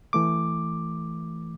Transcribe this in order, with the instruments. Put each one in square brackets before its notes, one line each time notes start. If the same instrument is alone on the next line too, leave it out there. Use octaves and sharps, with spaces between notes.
[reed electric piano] E3 A3 D6